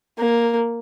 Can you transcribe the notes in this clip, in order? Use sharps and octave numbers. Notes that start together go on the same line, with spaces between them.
A#3